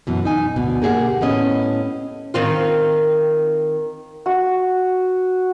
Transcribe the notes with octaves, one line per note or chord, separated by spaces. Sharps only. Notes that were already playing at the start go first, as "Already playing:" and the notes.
F#2 B2 E3
D#4 G#5
D2 B2
A#3 G4 G#4 E5 F#5
A2 B3 C#4 D#5
D#3 C4 F4
F#4